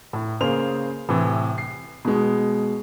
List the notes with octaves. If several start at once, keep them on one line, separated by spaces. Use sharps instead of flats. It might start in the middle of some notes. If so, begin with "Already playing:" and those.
A2
C#3 A#3 G#4 C5 F7
A2 C3 E3
C7
B2 G#3